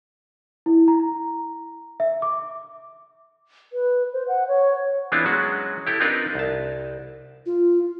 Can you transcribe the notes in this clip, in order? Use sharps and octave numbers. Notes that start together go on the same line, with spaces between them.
E4
A#5
E5
D6
B4
C5
F#5
C#5
E3 B3 C4 D4 E4 F4
F#3 G#3 C#4 F#4
E4 G4 A4
C4 D4 D#4 F4 A#4 B4
C2 A5
F4